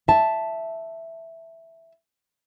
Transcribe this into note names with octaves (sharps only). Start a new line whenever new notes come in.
E5 A5